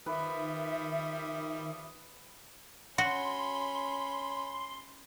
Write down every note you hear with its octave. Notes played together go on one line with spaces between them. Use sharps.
D#3 F3 G3 B4 E5 D#6
C#4 F#4 B5 C6